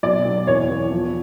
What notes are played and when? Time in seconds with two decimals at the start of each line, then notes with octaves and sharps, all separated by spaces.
0.03 B1 D5
0.25 B1
0.47 E2 C#5
0.70 E2
0.91 F3